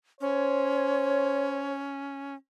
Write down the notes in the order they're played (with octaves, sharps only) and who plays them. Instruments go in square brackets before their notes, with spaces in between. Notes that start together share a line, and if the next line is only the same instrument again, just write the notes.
[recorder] C#4 [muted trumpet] C5 [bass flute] C#5